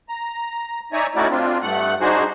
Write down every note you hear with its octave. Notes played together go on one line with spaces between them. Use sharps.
A#5
D#4 C#5 D5 E5 G#5 A#5
A3 C#4 D#4 E4 F#4 D5
C4 D4 F4
G2 A3 F#5 F#6
D4 D#4 F#4 G#4 C5